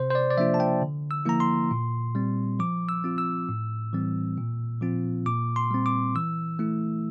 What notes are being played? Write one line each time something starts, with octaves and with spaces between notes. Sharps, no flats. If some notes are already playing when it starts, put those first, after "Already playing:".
Already playing: C3 C5
C5
D5
D5
F3 A#3 D4 F4 E5
A5
G5
D3
E6
F3 A#3 E4 A#5
C6
A#2
G3 C4
F3 D6
E6
C4 F4
E6
A2
E3 G3 C4
A#2
F3 C4 F4
A#2 D6
C6
G3 C4
D6
E3 E6
A3 E4